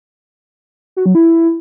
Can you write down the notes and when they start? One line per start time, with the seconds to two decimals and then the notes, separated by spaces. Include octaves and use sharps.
0.97 F#4
1.06 F#3
1.15 E4